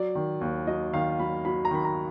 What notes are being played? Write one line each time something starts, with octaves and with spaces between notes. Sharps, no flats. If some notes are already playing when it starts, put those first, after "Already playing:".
Already playing: F#3 D5
D#3
D#2
F#3 D#5
D#3 F5
F#3 B5
F#3 B5
A#5
D#3 B5
A#5